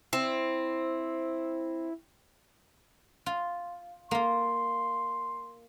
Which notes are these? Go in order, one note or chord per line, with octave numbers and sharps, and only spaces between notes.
C4 E4
F4
A#3 F4 C6